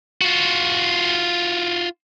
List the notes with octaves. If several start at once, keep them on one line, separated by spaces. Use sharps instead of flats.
F4 F#4